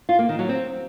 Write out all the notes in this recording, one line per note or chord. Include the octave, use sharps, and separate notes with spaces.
F4
A#3
D#3
F#3
C4